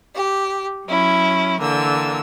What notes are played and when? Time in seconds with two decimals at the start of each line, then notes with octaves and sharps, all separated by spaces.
0.15 G4
0.86 F#3 C#4 E4
1.60 D3 E3 A#3 E6